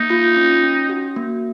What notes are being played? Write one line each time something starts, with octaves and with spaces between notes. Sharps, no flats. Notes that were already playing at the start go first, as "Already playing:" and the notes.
Already playing: A#3 D#4
F4
C#4
C#4
F#4
A#3